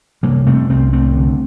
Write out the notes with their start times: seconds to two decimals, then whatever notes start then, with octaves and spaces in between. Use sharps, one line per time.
0.23 C3 G3 A#3
0.46 C3 A3 C4
0.69 C2 A3 C4
0.92 C2 A3 C4
1.16 D3